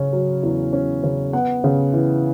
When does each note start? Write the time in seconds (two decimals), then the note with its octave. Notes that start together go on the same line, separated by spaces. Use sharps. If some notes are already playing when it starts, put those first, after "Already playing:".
Already playing: C#3 C#4
0.13 F#3
0.43 E2
0.73 C#4
1.03 C#3
1.33 B3 F#5
1.64 C#3
1.93 E3